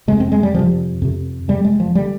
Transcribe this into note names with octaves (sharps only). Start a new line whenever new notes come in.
F2 C3 G#3
C4
G#3
G3
F2 C3 F3
F2 C3
F2 C3 G3
G#3
F3
D3 G3